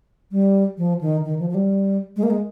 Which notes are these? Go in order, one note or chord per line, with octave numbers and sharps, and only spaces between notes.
G3
F3
D#3
D#3
F3
F3
G3
G#3
A#3
G#3